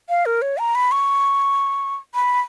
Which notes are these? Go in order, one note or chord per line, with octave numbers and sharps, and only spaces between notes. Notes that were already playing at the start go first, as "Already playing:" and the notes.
F5
A#4
C#5
A#5
B5
C#6
B5